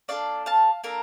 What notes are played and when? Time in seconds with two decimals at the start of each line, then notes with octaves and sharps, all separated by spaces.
0.08 A#3 D4 A4 D5 F5
0.46 F5 A5
0.84 A#3 D4 A4 A#4